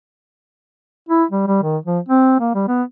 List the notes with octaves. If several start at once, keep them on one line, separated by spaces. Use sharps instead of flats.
E4
G3
G3
D#3
F3
C4
A#3
G3
B3